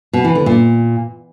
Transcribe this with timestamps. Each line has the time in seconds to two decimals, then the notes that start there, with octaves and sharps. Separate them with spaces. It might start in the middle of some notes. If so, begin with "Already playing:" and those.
0.13 B2
0.24 E3
0.35 D3
0.46 A#2